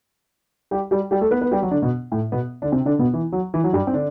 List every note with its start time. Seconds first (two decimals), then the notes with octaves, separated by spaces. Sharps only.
0.71 G3 G4
0.91 G3 G4
1.11 G3 G4
1.21 A3 A4
1.31 B3 B4
1.41 B3 B4
1.51 G3 G4
1.62 F#3 F#4
1.71 D3 D4
1.82 B2 B3
2.12 A2 A3
2.32 B2 B3
2.62 D3 D4
2.72 C3 C4
2.85 D3 D4
2.99 B2 B3
3.14 E3
3.32 F#3
3.54 E3
3.64 F#3
3.73 G2 G3
3.87 C4
3.93 D3 D4